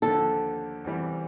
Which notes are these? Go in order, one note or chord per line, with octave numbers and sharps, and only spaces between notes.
D#2 D3 F3 A4
E2 C3 E3 G3